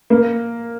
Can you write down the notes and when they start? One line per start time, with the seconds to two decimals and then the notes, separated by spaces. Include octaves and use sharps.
0.10 A#3